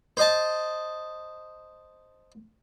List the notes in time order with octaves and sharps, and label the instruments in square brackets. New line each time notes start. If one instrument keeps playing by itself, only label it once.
[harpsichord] C5 D#5 A5